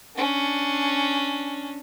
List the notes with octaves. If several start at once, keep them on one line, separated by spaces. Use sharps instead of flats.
C#4 D4